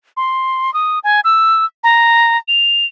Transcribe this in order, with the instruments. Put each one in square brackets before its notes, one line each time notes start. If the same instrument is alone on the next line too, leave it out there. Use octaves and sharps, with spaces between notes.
[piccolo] C6
D#6
G#5
E6
A#5
F7